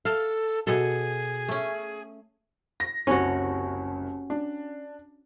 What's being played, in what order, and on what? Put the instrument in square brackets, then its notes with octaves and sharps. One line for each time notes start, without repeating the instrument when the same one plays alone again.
[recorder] A4 [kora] F5
[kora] B2 A4 [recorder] G#4
[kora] A3 C#4
[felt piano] A#6
[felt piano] F#1 C2 [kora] C#4 F#4
[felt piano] D4